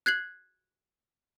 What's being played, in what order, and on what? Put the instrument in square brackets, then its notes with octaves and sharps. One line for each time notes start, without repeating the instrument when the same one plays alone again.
[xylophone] F#6 G#6 C7 F#7